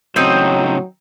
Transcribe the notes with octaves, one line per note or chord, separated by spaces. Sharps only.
A2 C#3 F#3 C4 D#4